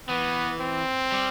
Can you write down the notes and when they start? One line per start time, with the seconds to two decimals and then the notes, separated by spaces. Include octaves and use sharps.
0.08 E3 B3
0.60 C4
1.12 G3